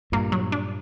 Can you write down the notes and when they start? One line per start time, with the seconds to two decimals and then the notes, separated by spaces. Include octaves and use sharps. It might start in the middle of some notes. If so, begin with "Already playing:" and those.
0.12 G2 A#2 A#3
0.32 F#3
0.52 D4